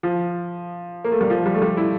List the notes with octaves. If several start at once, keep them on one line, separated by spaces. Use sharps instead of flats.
F3
A#3
A3
G3
F3
G3
A3
G3
E4